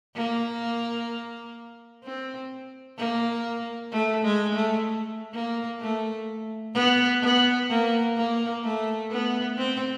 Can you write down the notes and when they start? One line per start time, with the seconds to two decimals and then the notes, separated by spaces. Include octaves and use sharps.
0.16 A#3
2.04 C4
2.98 A#3
3.92 A3
4.24 G#3
4.55 A3
5.34 A#3
5.81 A3
6.75 B3
7.22 B3
7.70 A#3
8.17 A#3
8.63 A3
9.11 B3
9.57 C4